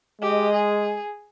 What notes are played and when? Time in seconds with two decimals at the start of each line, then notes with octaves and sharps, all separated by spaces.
0.22 G#3 G4 D#5
0.53 G#4